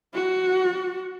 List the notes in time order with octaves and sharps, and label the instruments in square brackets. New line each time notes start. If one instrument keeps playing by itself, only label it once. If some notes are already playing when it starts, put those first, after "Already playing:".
[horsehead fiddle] F#4